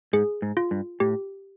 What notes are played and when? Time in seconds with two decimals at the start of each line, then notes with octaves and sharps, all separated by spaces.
0.13 G#2 G#4
0.42 G#2
0.57 F4
0.71 G2
1.00 A2 G4